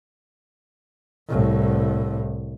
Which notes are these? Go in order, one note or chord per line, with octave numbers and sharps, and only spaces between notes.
C2 A2